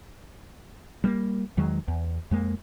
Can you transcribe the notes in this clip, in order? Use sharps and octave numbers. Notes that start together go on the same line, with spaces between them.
G3 A3 A#3
E2 D#3 F#3 G#3
E2
F2 G#3 A#3